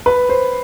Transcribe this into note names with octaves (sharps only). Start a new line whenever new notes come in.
B4
C5